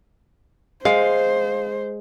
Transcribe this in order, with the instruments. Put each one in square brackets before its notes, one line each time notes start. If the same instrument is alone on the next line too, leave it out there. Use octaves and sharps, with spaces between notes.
[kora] G#3 [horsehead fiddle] C5 [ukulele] F5